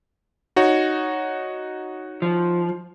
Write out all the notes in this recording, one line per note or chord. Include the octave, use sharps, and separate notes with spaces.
D#4 F#4 C#5
F3